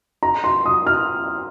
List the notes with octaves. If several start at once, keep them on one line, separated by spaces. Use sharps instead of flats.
A#5
C6
D#6
F6